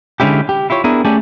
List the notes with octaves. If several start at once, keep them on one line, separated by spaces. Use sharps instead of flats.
D3 G#3 C#4 E4 G4
G4
E4 F4 G4 C#5
B3 D4 E4 G#4 A#4
A3 C#4 D4 G4 G#4